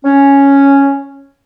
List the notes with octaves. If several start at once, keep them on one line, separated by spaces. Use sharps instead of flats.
C#4